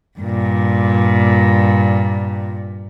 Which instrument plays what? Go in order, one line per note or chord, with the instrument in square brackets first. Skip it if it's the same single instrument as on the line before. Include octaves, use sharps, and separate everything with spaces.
[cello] G2 A#2